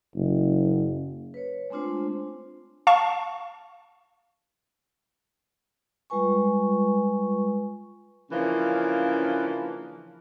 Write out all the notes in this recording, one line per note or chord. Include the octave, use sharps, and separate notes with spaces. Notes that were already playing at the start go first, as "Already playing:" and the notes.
F#1
B4 C#5
G#3 A3 C4 D4 F4 C5
F5 A5 C#6
G3 G#3 F4 B4 G#5 C#6
C#3 E3 F3 A#3 C#4 D4